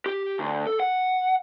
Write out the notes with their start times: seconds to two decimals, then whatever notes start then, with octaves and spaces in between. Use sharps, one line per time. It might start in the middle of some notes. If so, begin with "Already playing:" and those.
0.06 G4
0.39 D2
0.67 A4
0.80 F#5